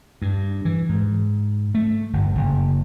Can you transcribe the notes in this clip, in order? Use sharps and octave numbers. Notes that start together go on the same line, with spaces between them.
G2
E3
G#2
A3
G1
F#1